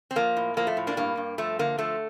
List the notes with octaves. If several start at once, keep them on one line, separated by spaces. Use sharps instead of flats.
C4
F3 A#3
A2
F3 A#3
A3
A2
A#3 D4
G2 A#3
G2
F3 A3
D3 A#3
F3 A3